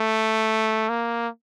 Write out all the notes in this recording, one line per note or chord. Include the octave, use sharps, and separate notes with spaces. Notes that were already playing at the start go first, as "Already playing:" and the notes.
Already playing: A3
A#3